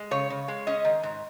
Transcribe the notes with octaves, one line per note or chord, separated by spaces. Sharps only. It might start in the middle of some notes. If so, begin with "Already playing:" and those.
Already playing: G#3
C#3 C#5
C#3
G#3
C#4 D#5
D#3
G#2